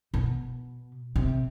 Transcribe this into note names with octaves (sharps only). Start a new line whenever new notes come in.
B2
C3